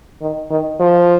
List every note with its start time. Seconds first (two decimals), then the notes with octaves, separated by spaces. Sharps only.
0.21 D#3
0.50 D#3
0.80 F3